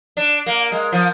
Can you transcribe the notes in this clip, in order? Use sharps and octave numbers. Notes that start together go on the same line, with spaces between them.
D4
A#3
G#3
F3